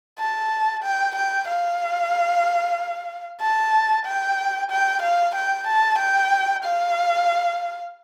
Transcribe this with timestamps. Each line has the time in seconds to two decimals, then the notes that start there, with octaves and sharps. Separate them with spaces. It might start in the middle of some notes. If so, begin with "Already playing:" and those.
0.19 A5
0.83 G5
1.16 G5
1.48 F5
3.41 A5
4.06 G5
4.71 G5
5.02 F5
5.35 G5
5.67 A5
5.99 G5
6.64 F5